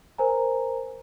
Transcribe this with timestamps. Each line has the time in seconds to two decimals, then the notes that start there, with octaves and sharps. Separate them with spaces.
0.18 A#4 C5 G#5 A#5